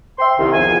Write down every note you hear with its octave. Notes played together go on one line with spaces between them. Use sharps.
C5 E5 G5 C6
C2 D#3
E2 F3 B3 G#5